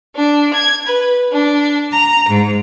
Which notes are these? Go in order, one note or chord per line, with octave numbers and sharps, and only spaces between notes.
D4
G#6
B4
D4
A#5
G#2